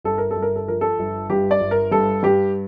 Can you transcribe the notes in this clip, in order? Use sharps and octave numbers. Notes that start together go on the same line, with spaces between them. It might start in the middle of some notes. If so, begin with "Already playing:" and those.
G1 A4
A#4
A4
G1
A#4
A4
F3 A#4
A4
G1
G2 G4
D5
G1
A#4
G2 A4
G2 G4